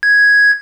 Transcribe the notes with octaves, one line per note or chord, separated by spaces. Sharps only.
G#6